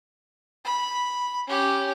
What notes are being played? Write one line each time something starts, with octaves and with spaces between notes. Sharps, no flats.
B5
C#4 G4